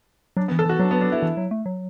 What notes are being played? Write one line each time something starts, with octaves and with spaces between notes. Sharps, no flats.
F#3 D4
B3
E3
A4
E3 F#4
F#3 D4
B3
D4
E4
E3
F#3
A3
F#3